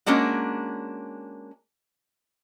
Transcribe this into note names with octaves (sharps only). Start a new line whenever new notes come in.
G#3 A#3 C#4 D4 F#4